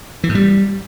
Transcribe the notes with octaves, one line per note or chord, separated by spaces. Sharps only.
E3
G#2
G3